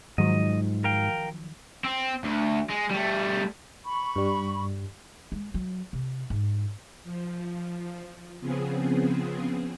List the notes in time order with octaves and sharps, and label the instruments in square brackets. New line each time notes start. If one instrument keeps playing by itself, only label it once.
[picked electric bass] G#2 [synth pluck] D#3 F3 F#3 [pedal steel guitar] D#5
[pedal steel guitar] A#4 F5 G5
[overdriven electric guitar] C4
D2
G#3
G3 A3
[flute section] B5 C#6
[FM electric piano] G2 G3
[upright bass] G#3
F#3
C3
G#2
[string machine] F3
C#3 F3 B3 C4 G#4